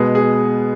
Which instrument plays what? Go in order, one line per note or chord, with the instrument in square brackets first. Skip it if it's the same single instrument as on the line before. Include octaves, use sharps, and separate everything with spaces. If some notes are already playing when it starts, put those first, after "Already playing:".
Already playing: [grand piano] B2 G#3 B3 G#4
G#4